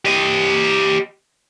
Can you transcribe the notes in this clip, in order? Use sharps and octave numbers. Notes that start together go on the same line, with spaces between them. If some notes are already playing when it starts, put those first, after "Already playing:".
G4 D#5